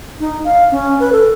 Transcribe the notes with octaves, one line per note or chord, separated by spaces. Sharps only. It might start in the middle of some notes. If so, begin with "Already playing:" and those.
D#4
F5
C#4
B4
A4